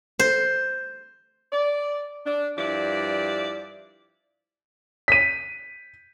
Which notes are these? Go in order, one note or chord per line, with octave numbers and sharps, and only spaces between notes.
C5
D5
D4
G2 F3 E4 D5
B6 D#7